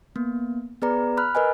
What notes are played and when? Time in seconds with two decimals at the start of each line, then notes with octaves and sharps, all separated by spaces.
0.16 A#3 B3
0.82 B3 G#4 B4 D5 A#5
1.17 B5 F6 F#6
1.35 A#4 B4 D#5 G#5